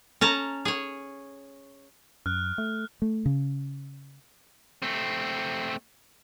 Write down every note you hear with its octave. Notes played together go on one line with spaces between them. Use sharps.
C#4 A5 A#5
G#4 C#5
F#2 F6 F#6
A3
A3
C#3
A3 C4